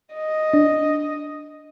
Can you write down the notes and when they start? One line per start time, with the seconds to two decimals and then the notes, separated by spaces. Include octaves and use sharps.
0.14 D#5
0.53 D4